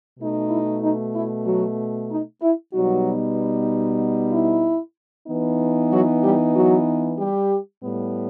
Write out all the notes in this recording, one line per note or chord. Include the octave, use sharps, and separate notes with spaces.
B2 A3 D#4
E4
D#4
E4
F#3 F#4
D#4
E4
B2 F#3 G3 B3 D#4 F#4
E4
E3 B3 D#4
F#3 F#4
G3 G4
F#3 F#4
G3 G4
A2 G3 B3